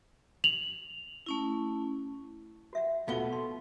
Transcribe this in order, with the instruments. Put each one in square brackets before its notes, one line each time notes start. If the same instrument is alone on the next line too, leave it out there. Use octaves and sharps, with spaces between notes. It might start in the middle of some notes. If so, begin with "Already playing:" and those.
[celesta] F7 F#7
[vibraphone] A3 C#4 E4
[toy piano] F#4 E5 F#5
[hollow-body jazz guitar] B2 B3 [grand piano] A3 G7 [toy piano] D#4 F4 F5
[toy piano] C6